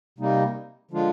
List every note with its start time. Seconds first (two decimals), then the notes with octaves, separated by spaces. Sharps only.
0.18 C3 G3 A#3 D#4
0.91 D3 F3 G#3 D4 F4